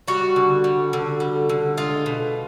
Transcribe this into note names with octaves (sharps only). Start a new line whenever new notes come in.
G3 F#4
D3
G3
D3
G3
D3
G#3 F4
B2